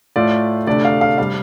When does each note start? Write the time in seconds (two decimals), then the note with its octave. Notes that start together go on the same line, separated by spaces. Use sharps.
0.16 A2 A3 F4 D5
0.67 D2 C3 A3 D4 D5
0.85 F5
1.01 F5
1.18 C3 G3 F5